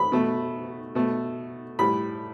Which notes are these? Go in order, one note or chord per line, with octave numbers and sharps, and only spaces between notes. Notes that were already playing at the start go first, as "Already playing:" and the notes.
Already playing: B5
B2 A3
B2 A3
A2 G3 B5